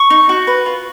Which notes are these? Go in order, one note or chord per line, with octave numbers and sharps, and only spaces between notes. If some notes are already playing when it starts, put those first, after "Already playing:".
Already playing: C#6
D#4
F#4
B4
F4